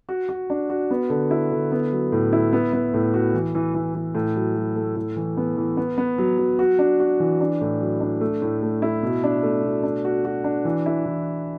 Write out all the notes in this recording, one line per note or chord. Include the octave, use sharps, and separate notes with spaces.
F#4
F#4
D4
F#4
B3
D3
E4
D3
B3
F#3
A2
E4
B3
B3
A2
F#4
E3
E3
E3
E3
A2
F#3
F#3
A3
A2
E3
B3
E3
B3
B3
F#3
F#3
F#4
D4
F#4
E3
D4
A2
F#3
D4
A3
A2
A3
E4
B2
D4
A3
B2
D4
F#4
F#4
D4
E3
E4
E3